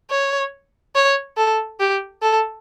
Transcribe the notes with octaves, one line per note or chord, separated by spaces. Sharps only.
C#5
C#5
A4
G4
A4